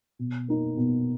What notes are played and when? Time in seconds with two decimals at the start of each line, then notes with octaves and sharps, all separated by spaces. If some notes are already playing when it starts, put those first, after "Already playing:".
0.19 B2
0.48 A#3 D#4
0.77 B2